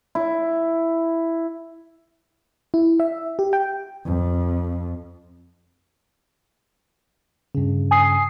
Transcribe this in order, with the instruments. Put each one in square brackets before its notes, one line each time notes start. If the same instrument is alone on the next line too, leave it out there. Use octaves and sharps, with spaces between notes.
[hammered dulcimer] E4
[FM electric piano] E4
E5
G4
G5
[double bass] F2
[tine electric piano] G2 C#3
[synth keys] G#5 D#6 C7